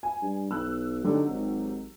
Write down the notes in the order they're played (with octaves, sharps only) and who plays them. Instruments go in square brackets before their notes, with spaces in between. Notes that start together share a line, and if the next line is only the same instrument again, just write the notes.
[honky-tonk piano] G#5
[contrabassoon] G2
[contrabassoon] B1 [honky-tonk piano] E6 F#6
[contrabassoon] D3 [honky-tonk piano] F#3 D#4 G4
[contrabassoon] G#1